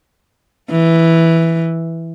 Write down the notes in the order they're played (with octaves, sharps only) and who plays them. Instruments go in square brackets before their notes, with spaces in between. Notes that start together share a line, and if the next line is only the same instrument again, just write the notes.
[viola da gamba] E3